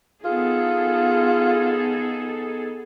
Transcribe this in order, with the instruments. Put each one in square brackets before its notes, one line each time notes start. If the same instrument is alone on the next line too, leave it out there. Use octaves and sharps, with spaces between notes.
[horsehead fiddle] B3 D#4 [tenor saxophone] F4 [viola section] G#4 A4